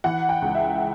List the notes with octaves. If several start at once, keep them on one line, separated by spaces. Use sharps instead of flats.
E3 F#5
G5
C#2
E5